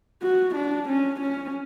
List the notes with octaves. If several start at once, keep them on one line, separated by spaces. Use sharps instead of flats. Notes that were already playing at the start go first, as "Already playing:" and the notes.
F#4
D4
C#4
C#4